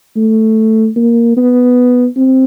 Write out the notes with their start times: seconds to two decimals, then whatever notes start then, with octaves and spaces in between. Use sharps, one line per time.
0.17 A3
0.96 A#3
1.37 B3
2.16 C4